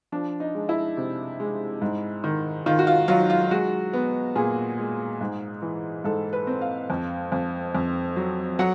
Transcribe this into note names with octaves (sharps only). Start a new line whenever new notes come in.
F3 D4
D#4
G#3
E4
C3
G#3
G#2
D#3
D#3 F4
F#4
F4
F#3 F4
F4
G#3 F#4
B3
A#2 G#4
G#3
G#2
E3
G#2 A4
B4
C4
F5
F2
F2
F2
F#3
F#3 F#5